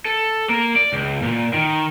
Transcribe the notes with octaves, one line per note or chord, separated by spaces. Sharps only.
A4
A#3
D5
C#2
A#2
D#3